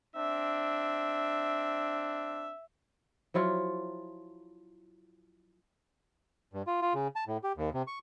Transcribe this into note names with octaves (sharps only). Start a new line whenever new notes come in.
C4 D4 E5
F3 F#3 E4 F4
G2
F4
F4
C#3
A5
A2
G4
D#2
C3
C#6